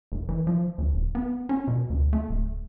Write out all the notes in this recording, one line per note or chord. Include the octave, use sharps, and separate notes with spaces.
F1
E3
F3
D2
D1
B3
C#4
B2
D2
A3
D1